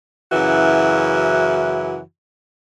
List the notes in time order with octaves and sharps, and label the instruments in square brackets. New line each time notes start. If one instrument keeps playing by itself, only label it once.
[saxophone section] F#2 C#3 E3 E4 F#4